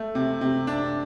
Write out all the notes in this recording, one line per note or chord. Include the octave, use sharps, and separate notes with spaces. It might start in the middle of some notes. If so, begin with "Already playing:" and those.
Already playing: A3
C3
C3
D4